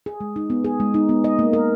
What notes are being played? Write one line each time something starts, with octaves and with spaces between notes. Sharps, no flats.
G#4
G#3
D#4
B3
G#4
G#3
D#4
B3
D#5
A#3
A#4